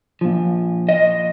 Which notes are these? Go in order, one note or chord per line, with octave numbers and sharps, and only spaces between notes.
A#2 F3
D#5